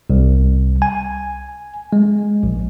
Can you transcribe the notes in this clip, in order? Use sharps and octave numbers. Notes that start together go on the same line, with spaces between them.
C2
G#5
G#3
A#1